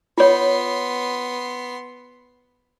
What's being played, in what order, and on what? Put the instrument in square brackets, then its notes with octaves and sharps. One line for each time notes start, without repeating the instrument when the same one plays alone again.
[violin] B3 C6 [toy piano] F4 C#5